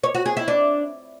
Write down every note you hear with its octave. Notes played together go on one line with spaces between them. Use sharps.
C#5
F#4
G#4
E4
D4